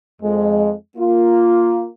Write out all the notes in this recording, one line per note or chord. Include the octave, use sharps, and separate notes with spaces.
F2 G#3
A#3 F4